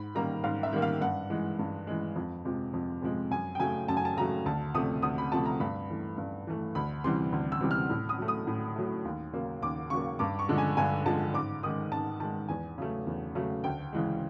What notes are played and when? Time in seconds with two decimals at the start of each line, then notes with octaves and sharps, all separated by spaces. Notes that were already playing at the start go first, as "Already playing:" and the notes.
Already playing: G#2 B5
0.15 D#3 G3 A#3 A#5
0.44 G#2 F5
0.63 E5
0.73 D#3 G3 A#3
0.82 F5
1.01 G2 F#5
1.30 E3 G#3
1.59 G2
1.87 E3 G#3
2.16 F2
2.45 C3 F3 G#3
2.74 F2
3.02 C3 F3 G#3
3.31 F#2 G#5
3.55 G5
3.59 C#3 F#3 A3 G#5
3.88 F#2 A5
3.97 G#5
4.05 A5
4.17 C#3 F#3 A3 A#5
4.46 D2 A5
4.74 C3 F3 A3 D#6
5.02 D2 D#6
5.18 B5
5.32 C3 F3 A3 A5
5.46 A#5
5.60 G2 B5
5.89 E3 A3
6.18 G2
6.47 E3 A3
6.75 D2 B5
7.04 C3 E3 G3 C6
7.32 D2
7.52 E6
7.61 C3 E3 G3
7.71 F6
7.90 A2
8.09 D#6
8.18 F#3 A3
8.28 D#6
8.47 A2
8.76 F#3 A3
9.05 D#2
9.33 C#3 F#3 A#3
9.62 D#2 D6
9.90 C#3 F#3 A#3 C#6
10.19 G2 D6
10.39 C#6
10.48 D3 F3 G#3
10.58 G#5
10.77 G2 G#5
11.06 D3 F3 G#3 A5
11.34 G#2 D6
11.63 D#3 G#3 D#6
11.92 G#2 A5
12.20 D#3 G#3 A5
12.48 E2 G#5
12.78 C#3 F#3 A3
13.07 E2
13.35 C#3 F#3 A3
13.64 D2 G5
13.93 C#3 E3 G#3